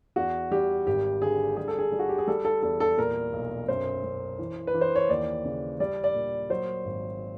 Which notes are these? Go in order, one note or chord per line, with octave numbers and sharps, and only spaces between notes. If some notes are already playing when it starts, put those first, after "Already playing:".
E2 F#4
G3 G4
G#1 G4
D3 G#4
G3 G#4
A4
G#4
G3
F#4
G4
G#4
G3 A4
A4
E2 A4
A4
A#2 A#4
B1
F#2 C5
F#2
E3
B4
E3
C5
C#5
D#2 D5
C#3
G3 D5
D5
A#2
F#3 C5
G#1